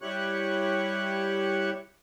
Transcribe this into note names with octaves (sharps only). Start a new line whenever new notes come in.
G3 E4 G4 C#5 C#6 F#6